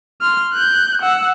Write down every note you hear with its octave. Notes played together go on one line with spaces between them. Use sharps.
C6 F6
F#6 G6
F#5 E6